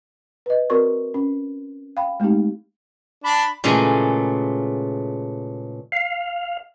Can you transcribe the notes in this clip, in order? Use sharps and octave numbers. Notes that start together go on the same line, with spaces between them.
B4 D#5
C4 F#4 A#4 D5 C6 C#6
C#4
F5 G5 B5
G#3 A3 C4 D#4 G4
D4 B5
A#2 C#3 E3 G#3 A3
F5